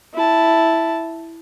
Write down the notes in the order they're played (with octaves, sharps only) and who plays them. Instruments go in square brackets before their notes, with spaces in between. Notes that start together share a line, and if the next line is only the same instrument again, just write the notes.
[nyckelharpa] E4 A5